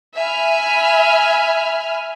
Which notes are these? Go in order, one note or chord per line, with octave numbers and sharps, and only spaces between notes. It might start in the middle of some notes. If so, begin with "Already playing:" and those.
E5 G#5 B5 F6